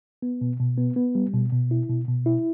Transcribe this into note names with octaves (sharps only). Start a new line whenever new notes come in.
B3
B2
B2
B3
B3
G3
B2
B2
E4
B2
B2
E4